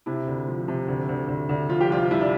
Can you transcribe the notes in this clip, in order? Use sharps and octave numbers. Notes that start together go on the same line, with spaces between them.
C3 E4
D2
F3
C3
D2
D2
D2
D2
F3 F4
G4
C2 F4
C2 E4
D4